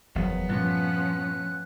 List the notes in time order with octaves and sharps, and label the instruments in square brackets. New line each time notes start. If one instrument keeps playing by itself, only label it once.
[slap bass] F#1 E2 F3 [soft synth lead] F#3 [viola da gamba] B3
[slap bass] G2 A#2 A3 [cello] F3 C#4 [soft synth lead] F#6